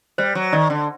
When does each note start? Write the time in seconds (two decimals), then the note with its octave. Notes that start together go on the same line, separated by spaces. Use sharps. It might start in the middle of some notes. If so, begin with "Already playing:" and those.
0.18 G3 C5
0.35 F#3
0.53 D#3 D5
0.70 D3